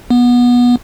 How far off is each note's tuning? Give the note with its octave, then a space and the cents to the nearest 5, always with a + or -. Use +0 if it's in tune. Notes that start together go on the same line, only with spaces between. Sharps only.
B3 -20